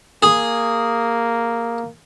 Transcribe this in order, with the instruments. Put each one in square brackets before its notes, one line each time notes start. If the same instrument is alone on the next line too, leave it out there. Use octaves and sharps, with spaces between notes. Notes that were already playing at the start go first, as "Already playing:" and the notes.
[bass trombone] A#3 [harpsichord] G#4